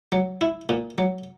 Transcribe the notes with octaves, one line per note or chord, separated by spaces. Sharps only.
F#3
E4
A#2
F#3